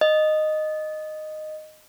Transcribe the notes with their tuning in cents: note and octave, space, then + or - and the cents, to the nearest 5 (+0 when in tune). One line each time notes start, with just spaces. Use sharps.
D#5 -10